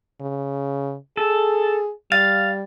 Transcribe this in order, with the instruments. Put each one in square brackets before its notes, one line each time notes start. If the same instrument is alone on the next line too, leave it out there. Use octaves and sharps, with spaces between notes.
[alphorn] C#3
[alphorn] G#4 [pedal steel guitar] A4
[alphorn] G3 [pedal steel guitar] F5 [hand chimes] A6